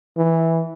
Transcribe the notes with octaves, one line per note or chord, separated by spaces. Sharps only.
E3